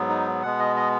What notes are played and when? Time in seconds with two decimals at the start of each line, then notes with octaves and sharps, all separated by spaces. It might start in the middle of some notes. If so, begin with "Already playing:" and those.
Already playing: G#2 F#3 B3
0.09 D#4
0.43 B2 G#3 B3 F#5
0.59 D#5
0.76 D#5